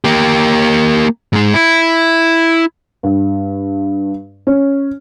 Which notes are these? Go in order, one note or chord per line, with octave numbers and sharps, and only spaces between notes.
A#3 G4
G#2 G#3
E4
G2
C#4